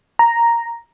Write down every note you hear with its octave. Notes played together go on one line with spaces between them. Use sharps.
A#5